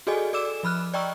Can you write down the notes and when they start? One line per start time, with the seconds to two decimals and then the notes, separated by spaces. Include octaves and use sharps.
0.07 F#4 G#4 A4 D5 D#5 G#5
0.33 A4 D5 D6 E6 E7
0.63 F3 B5 F6 F#6
0.94 D5 D#5 G5 A#5 C#6 E6